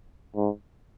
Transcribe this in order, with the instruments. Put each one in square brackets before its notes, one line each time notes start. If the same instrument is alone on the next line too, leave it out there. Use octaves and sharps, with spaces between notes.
[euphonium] G#2